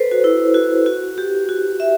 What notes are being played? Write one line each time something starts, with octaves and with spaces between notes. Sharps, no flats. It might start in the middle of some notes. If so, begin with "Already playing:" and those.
Already playing: A4 B4 C5
F#4
E4
F#4
F#4
G4
F#4
E5